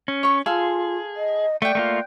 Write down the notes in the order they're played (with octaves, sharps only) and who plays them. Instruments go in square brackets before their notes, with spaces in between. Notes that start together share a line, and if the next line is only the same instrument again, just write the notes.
[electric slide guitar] C#4
[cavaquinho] C#5 C#6
[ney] F4 [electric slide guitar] G#4 [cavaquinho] A4 F5 C6
[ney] D#5
[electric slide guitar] A3 [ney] D5 [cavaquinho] F#5 G5
[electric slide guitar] A3 A#3 F4